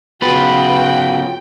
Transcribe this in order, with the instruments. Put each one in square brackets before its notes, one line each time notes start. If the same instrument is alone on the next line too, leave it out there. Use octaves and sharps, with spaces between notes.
[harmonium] C#3 F#4 [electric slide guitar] B3 F4 G#4 [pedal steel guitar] B4 [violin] G5